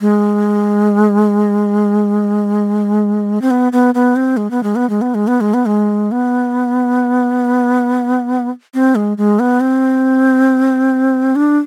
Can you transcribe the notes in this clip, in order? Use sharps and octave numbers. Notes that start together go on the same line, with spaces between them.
G#3
C4
B3
B3
B3
C4
G#3
B3
G#3
B3
G#3
B3
G#3
B3
G#3
B3
G#3
B3
C4
G#3
G#3
B3
C4
D4